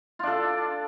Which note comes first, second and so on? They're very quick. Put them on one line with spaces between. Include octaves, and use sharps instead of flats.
F4 D4 A4